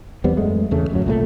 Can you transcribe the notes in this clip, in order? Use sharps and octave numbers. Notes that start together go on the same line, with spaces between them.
E2 G3 B3 C4
F#2 G#3 A3
E2 C#3 A3
D1 F#2 F#3
C2 A#2 A3